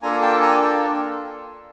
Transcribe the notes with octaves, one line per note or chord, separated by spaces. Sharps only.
A#3 D4 F4 A4 G#5 A#5
G5 A5
G#5 A#5
G5 A5